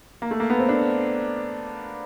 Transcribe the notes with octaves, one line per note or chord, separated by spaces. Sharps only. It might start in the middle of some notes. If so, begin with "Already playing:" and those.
A#3
A3
A#3
B3
C4
D4